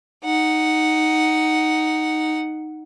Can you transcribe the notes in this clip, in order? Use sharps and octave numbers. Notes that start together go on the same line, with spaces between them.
D#4 F#5